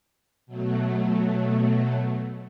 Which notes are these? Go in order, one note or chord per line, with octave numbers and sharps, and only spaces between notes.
B2 F#3 A3